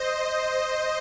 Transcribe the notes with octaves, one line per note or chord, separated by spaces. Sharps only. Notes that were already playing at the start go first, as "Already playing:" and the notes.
Already playing: C5 D#5